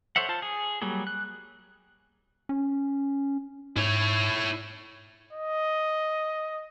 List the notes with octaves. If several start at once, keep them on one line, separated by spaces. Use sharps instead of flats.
A4 C5 C#5 E5 F#5
F4 C5 A5
G#4
F#3 G3 A#3 G#4
F#6
C#4
G#2 E4 C#5
D#5